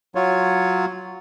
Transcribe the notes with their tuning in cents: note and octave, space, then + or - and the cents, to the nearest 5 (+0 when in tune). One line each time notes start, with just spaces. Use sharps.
F#3 +0 F4 +0 C#5 +0